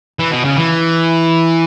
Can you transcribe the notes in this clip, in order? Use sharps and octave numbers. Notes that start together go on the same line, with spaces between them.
E3
B2
C#3
E3